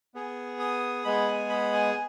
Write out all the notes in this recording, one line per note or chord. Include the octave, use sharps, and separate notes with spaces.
B3 G#4
D#6
G#3 B3 G#4 B5
G#5
B5
G#5